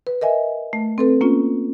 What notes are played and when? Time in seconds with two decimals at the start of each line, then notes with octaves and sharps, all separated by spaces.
0.07 B4
0.21 A#4 D#5 E5 G#5
0.73 A3
0.98 C4 A4 B4
1.21 A#3 C#4 F4